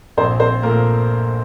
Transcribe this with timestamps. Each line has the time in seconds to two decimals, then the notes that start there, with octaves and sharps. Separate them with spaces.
0.17 A#1 C4 C5
0.40 C4 C5
0.62 A#2 A3 A#3 A#4